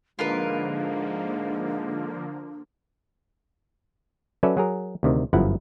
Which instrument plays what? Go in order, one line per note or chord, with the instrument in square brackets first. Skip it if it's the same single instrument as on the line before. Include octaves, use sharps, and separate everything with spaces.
[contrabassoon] G#2 [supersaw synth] D3 F3 A#3 [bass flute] D4 [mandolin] F4 A#4 B4
[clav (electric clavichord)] F#3 C#4 A4 B4 D5 E5
F#3 G#4 A#4
D2 C3 D#3
G1 F#2 F3 E4 F#5